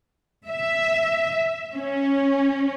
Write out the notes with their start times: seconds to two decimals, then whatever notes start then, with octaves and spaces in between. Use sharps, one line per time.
0.47 E5
1.73 C#4